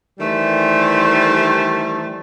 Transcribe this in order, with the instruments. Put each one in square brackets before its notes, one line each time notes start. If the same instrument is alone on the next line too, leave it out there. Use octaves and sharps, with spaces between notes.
[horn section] D#3 E3 G3 A3 C5